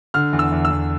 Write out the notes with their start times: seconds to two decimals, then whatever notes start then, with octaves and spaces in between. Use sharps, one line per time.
0.14 D3 F6
0.33 E2
0.39 E6
0.52 E2
0.65 E6
0.71 E2